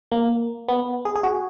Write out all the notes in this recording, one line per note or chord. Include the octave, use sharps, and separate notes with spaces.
A#3
B3
G#4
G#4
F#4